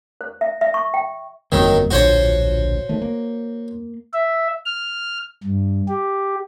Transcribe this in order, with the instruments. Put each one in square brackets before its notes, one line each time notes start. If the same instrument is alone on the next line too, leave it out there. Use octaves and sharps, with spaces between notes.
[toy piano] C5
E5
E5
C#6
G5
[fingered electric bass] G1 F2 A#3 [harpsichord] D#3 F#3
[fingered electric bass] D1 A#1 F3 [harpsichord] F#4 C5 C#5
[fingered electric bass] D#3 A3
A#3
[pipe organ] E5
F6
G2
G4